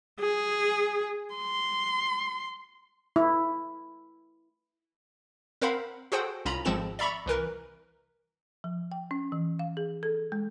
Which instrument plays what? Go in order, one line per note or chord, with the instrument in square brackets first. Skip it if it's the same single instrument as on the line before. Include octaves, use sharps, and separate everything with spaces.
[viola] G#4
C6
[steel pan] E4
[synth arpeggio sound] C4 A#4 C5 F5 F#5 B5
F#4 G#4 A4 C5 F#5 G5
C2 C#4 F4 A#5 B5
G#1 F3 G#3 C4 A4 E7
D5 E5 A#5 B5 C#6
C2 E3 A#4 B4
[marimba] F3
G5
C#4
E3
F5
G#4
A4
G#3